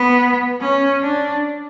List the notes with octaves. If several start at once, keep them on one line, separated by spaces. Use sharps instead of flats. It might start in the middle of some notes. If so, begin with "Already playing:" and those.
Already playing: B3
C#4
D4